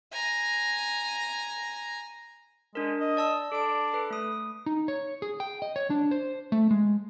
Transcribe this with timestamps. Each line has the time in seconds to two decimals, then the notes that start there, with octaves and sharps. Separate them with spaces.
0.13 G#5 A#5
2.75 G#3 D4 A#4
3.01 D#5
3.17 D5 A5 E6
3.52 D4 A4 D7
3.93 A4 B4
4.10 A3 D#6
4.66 D#4
4.88 C#5
5.22 G#4
5.40 G5
5.62 D#5
5.76 C#5
5.90 D4
6.11 C5
6.52 A3
6.71 G#3